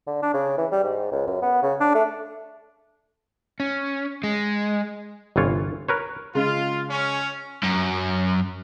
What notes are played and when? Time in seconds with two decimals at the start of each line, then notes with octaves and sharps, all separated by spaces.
0.07 D3
0.22 D4
0.34 C#3
0.58 E3
0.72 G3
0.84 G#2
1.12 C#2
1.27 F#2
1.42 B3
1.62 C#3
1.80 D4
1.95 A3
3.60 C#4
4.24 G#3
5.36 G1 C2 E3 F4 C#5
5.88 A#4 B4 C#5
6.35 C#3 G#3 F4
6.90 C#4
7.64 F#2